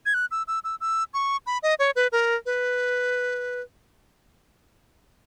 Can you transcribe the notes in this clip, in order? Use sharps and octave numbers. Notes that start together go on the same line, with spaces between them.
G#6
F#6
E6
E6
E6
E6
C#6
B5
D#5
C#5
B4
A#4
B4